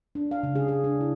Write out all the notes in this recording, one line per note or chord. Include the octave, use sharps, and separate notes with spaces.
D4
F5
C#3
G#4
G#4
D4
E4